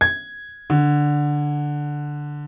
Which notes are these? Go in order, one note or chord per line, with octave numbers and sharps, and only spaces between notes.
G#6
D3